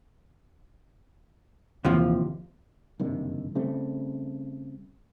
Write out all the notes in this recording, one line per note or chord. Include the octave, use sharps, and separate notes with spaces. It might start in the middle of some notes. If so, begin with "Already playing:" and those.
D#1 D#2 C3 E3 F3
F#1 G2 C3 D#3
C#3 G3 A3 C4